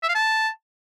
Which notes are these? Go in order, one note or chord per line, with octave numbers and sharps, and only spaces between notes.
E5
F5
A5